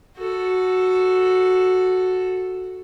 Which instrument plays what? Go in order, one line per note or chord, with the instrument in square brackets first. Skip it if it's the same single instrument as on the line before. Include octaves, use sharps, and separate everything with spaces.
[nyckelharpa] F#4 A4